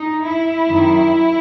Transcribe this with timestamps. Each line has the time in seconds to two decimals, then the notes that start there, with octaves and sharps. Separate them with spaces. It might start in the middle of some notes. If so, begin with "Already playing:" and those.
Already playing: D#4
0.24 E4
0.68 F#2 D#3 F#3